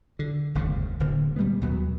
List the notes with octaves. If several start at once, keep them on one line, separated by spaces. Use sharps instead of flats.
D3
F#1 D#2 G#2 C#3
D1 D2 D3 A#3
A#2 G3 G#3 B3
D#2 B2 F#3 B3